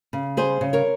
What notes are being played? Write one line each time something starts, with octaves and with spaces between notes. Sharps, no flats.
C#3
G3 G#4 C5
C#3
A#4 C#5